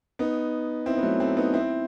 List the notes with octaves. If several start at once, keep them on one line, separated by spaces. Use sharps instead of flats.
B3 D#4
C4 E4
B3
F#3 A3
A3 C4
B3 D#4
C4 E4